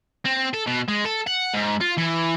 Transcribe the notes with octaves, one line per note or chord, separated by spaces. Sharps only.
C4
A4
B2
G#3
A4
F#5
G#2
F4
E3